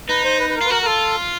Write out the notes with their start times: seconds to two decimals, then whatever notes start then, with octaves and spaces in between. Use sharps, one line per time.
0.09 D#4 B4
0.24 C5
0.40 B4
0.50 B4
0.56 A#4
0.61 F4
0.65 B4
0.70 F#4 A#4
0.82 A#4
0.86 F4 A4